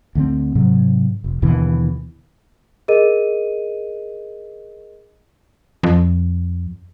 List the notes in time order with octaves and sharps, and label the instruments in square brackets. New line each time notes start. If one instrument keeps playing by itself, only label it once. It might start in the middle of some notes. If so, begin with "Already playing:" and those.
[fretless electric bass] D2 D3 C4
G#2 C3 F#3
F1
D#2 B2 D3 E3
[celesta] G#4 A#4 D#5 D#7
[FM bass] F2